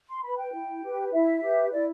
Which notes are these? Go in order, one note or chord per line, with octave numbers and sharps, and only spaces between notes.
C6
B4 B5
G5
E4
G4 B4
E4 E5
G4 B4
E4 D5